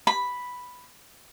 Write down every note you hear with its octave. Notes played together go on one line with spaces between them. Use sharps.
B5